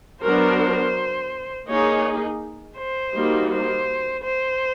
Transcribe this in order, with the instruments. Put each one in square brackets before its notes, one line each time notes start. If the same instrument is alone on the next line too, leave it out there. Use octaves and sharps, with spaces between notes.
[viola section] F#3 B3 D4 F#4 A#4 [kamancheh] C5
[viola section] A#3 D#4 G#4 [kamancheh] C#5
[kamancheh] C5
[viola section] G3 A#3 D#4 F#4
[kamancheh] C5
C5